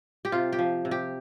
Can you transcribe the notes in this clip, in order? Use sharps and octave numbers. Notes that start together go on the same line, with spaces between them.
G4
C3 F4
G4
F3
C3
G4